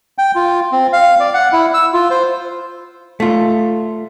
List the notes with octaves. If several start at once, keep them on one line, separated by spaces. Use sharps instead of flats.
G5
F4
C4
F5
D5
F#5
E4
E6
F4
C5
A3 F4